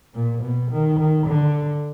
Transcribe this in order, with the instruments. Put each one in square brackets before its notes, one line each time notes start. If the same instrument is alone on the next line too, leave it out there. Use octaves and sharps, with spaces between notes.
[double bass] A#2
B2
D#3
D#3
D3